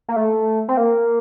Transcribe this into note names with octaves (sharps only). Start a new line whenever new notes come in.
A#3
A3
C4
A#3